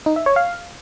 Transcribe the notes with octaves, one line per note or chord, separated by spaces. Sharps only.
D#4
E5
C#5
F5